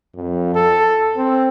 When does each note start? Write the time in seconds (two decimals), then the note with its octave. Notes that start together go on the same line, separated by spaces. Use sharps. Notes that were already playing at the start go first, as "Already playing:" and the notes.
0.15 F2
0.55 A4
1.17 C4